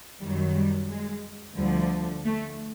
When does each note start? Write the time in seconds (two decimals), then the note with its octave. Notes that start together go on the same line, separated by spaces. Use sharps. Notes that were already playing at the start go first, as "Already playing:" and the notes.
0.21 F#2 D#3 F#3 G3
0.55 G3
0.88 G#3
1.56 D2 D3 F3 G3
2.25 A3